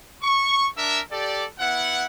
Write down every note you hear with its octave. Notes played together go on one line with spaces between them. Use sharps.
C#6
D4 A#4 E5
G4 A4 D5
B3 E4 F#5